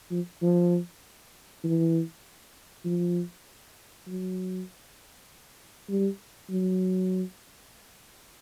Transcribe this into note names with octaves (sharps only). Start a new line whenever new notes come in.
F3
F3
E3
F3
F#3
G3
F#3